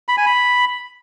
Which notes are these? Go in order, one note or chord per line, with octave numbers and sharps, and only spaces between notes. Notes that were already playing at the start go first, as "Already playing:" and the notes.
B5
G#5
B5